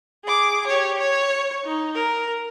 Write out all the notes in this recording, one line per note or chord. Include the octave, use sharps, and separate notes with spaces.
G#4 D6
G4 C#5
C#5
D#4
A#4